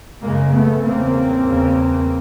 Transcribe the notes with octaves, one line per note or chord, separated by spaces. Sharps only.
F#2 C#3 G#3 A#3
A3 B3
E2 C#3 A#3 C4
E2 C#3